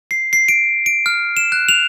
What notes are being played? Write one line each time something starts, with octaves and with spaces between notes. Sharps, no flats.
C7
C7
D7
D7
F6
E7
F#6
F7